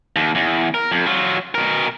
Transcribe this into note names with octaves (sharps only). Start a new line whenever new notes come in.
D#2
E2
A#4
F2
F#3 F4
B2 A#4